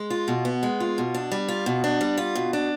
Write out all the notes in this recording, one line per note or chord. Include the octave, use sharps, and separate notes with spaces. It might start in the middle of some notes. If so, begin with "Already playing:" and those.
Already playing: G#3
F4
B2
B3
G#3
F4
B2
D4
G3
F4
B2
D4
G3
F4
B2
D4